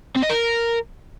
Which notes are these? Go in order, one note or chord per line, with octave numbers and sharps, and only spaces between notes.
C4
D#5
A#4